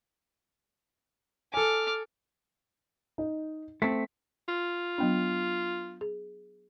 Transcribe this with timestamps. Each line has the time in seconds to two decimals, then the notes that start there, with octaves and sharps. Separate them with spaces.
1.54 A4 G#5 D6 F6
3.18 D#4
3.82 A3 C4 B6
4.48 F4
4.98 F#3 B3 D4
6.01 G#4